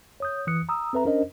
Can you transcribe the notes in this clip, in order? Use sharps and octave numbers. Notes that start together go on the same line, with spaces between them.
C#5 D#6 G6
E3 D#6 F#6 C#7
A#5 D#6 E6
C4 A4 B4 E5 A#5
C#4 D4 A#4 C5 D#5